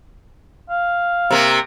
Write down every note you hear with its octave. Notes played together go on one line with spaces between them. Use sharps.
F5
C3 A#3